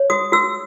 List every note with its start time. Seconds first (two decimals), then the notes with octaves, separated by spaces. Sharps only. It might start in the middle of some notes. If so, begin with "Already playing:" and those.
Already playing: C#5
0.10 F#4 D#6
0.32 F#4 E6